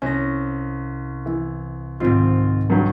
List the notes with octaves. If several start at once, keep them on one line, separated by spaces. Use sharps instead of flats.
C2 C#4 A#6
E3
G#2 D#3 C4 F4
G2 F#3